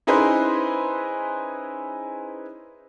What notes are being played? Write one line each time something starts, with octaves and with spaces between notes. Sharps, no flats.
C#4 D#4 E4 G#4 B4 C5